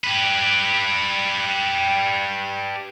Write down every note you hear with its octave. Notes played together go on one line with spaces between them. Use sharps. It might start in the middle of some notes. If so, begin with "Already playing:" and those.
G4 B4